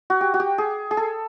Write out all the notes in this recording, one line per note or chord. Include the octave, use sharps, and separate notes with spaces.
F#4
G4
F#4
G4
G#4
G#4
A4